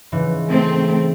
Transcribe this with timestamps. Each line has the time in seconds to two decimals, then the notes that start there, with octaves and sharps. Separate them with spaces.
0.12 G#2 C#3 E3
0.48 A3 C4